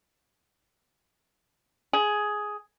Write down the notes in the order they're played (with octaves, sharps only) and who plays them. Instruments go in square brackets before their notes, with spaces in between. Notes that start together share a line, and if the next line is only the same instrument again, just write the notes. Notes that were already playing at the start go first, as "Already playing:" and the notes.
[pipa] G#4